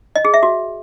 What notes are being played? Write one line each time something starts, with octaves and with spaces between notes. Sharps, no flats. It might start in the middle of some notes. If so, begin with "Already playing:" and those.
D#5
G#4
E5
F#4